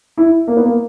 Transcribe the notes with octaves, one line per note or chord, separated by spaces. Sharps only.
E4
A#3
B3
A#3